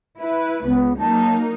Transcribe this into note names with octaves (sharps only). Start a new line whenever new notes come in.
E4 B4
C#2 B3
F#3 A#3 D#4 A5